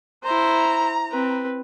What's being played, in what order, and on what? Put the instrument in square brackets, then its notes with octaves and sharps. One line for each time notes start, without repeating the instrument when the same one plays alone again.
[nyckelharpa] E4 C5 [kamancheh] A#5
[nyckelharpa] C4 B4